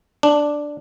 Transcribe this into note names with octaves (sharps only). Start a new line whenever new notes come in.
D4